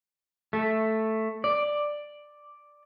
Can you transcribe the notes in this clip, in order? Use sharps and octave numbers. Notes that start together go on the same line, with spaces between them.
A3
D5